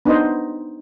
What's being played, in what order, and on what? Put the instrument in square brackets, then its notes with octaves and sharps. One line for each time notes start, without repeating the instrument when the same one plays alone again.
[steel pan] B3 D4 D#4 B4 C5 D#5